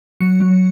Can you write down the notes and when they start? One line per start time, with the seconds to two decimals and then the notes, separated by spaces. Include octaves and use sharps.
0.20 F#3 C#7
0.40 F#3